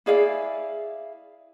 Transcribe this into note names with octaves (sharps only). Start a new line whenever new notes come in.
E4 G#4 D5 F5